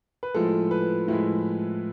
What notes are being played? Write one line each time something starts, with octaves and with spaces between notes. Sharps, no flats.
B4
A2 F3 G#3 A4
B4
A2 F3 G#3 E4